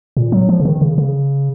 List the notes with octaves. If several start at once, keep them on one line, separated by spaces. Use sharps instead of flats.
A#2
F#3
F3
C#3
D#3
C#3
C#3